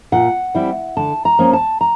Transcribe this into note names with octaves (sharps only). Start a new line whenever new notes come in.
A#2 F#5
G3 C4 E4
D3 A5
A#5
F3 A#3 C#4
A5
A#5